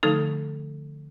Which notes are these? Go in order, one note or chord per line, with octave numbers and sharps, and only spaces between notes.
D3 F3 A3 D#4 A4